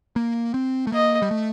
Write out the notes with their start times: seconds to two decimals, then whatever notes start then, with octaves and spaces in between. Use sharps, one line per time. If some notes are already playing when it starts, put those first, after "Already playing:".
0.16 A#3
0.54 C4
0.87 A3
0.92 A#3 D#5
1.22 G3
1.31 A3